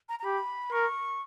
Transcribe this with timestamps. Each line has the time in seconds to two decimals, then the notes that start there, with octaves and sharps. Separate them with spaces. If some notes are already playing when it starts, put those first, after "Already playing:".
0.09 A#5
0.19 A#5
0.24 G4 B5
0.72 A#4 C#6